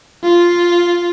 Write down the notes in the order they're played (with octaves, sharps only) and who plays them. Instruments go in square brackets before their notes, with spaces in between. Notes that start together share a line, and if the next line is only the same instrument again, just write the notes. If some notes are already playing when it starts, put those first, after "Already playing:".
[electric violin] F4